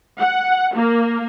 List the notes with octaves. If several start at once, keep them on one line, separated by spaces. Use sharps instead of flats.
F#5
A#3